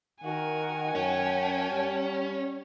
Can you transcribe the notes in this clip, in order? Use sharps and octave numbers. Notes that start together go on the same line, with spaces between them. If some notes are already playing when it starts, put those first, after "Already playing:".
D#3 F#4 A#4 F#5 G#5
F#2 C#4 G5 A5
G3